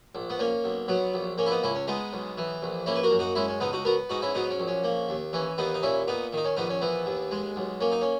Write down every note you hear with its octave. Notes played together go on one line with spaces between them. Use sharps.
A#1
B3
A#3 C#4
B1
F#3 B3
A#1
A#3 C#4
E4
B3 D#4
C#2 C#4 E4
C#4
G#3 B3 D#4
B1
E3
A#1
A#3 C#4 E4
B4
F#4 A#4
F#2
D#4 F#4
G#3 C#4 E4
C#4
C#2 B3 D#4
D#4 F#4
B3 F#4 A#4
G#2 D#4 F#4
C#4 E4
F#3 B3 D#4
C#4
A#1
C#4
A#3
D#2
E3 C#4
D#2 B3 D#4
D#4
A#2 C#4 E4
A#2 B3 D#4
D#3 D#4
C#4
A#1 B3 D#4
C#4
E3 B3
D#2
G#3
B1
A#3 C#4
D#4
C#4